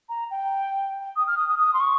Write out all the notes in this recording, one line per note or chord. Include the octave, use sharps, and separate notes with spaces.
A#5
G5
D#6
F6
D#6
D#6
D#6
C6
C#6